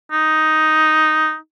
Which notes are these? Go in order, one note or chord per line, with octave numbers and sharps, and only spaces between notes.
D#4